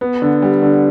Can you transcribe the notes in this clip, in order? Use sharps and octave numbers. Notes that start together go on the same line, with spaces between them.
B3
D3
G3
D3